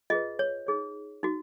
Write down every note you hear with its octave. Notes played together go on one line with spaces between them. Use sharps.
F4 G#4 B4 D#5
C#5
D#4 G#4 C#5
D#4 F#4